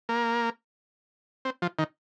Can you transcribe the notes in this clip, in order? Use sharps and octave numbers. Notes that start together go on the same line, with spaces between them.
A#3
C4
F3
D#3